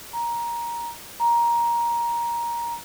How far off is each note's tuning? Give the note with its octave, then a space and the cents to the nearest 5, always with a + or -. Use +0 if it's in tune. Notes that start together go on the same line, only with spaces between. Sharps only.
A#5 +15
A#5 +15